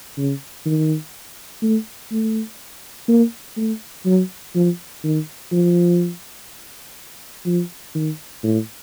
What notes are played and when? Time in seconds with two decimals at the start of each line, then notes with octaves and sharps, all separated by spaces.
0.17 C#3
0.66 D#3
1.62 A3
2.12 A3
3.08 A#3
3.57 A3
4.06 F#3
4.55 F3
5.04 D#3
5.52 F3
7.46 F3
7.95 D#3
8.43 A2